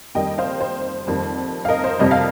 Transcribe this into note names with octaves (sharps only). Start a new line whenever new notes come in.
F2 D#3 G3 D#5 G5
C5 F5
C5
F2 D#3 G3
F5
A#4 D#5
C5
F2 C3 G3 A#4 D#5
F5